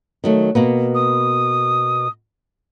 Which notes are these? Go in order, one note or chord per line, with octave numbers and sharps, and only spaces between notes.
D#3 F#3 A3
B2 A#3 B3
D#6